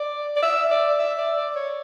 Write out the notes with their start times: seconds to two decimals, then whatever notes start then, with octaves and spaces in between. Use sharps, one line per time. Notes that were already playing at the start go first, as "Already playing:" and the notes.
Already playing: D5
0.36 D5
0.42 E5
0.71 D5
0.99 E5
1.18 D5
1.36 D5
1.55 C#5